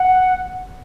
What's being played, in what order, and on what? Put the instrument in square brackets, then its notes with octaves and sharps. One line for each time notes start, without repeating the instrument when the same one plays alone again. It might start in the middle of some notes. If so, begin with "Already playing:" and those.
Already playing: [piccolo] F#5